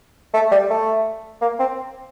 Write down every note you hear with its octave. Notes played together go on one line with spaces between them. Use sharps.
A3
G3
A3
A#3
C4